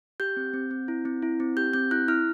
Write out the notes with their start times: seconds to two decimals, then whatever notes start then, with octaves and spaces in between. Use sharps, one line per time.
0.20 G4 G6
0.37 C4
0.54 C4
0.71 C4
0.88 E4
1.05 C4
1.22 E4
1.40 C4
1.57 G4 G6
1.73 C4 G6
1.91 E4 F#6
2.08 E4 F6